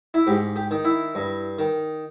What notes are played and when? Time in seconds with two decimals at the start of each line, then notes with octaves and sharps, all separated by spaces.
0.14 E4
0.27 G#2 G4
0.56 G4
0.71 D#3
0.85 E4
1.15 G2
1.59 D#3